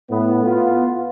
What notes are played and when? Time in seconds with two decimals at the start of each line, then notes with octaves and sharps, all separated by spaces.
0.10 A2 B3
0.45 B3 F4